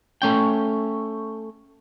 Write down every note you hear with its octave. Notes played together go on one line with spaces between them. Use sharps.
A3 C#4 G5